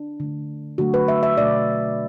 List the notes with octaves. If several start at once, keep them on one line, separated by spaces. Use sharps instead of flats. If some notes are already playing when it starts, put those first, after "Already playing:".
Already playing: D4
D3 A3
D3 F#3 A3 F#4
B4
E5
E5
B2 A3 D5